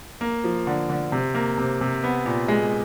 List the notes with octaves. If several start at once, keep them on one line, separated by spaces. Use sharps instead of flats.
A#3
F3
D3
D3
C3
A#3
C3
C3
B3
A#2
G#3